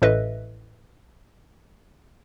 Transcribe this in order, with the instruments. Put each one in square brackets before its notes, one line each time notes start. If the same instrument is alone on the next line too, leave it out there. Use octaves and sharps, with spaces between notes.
[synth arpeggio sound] A1 A2 A4 B4 D#5 E5